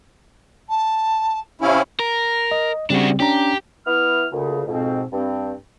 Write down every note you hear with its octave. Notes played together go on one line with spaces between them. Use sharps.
A5
C3 C#4 E4 F5
A#4
D#5
C#3 G3 C4 D4 F#4
C#4 D4 G4 A#5
B3 E4 F6
D2 A#2 C#3
F2 G#2 B2 C4
G2 C4